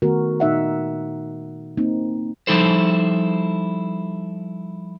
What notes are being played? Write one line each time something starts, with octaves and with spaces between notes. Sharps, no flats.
D#3 A3 B3 F#4 A#4
A#2 D#4 E5 F#5
A#3 C4 D#4
F3 G3 D#4 E4 A4 C5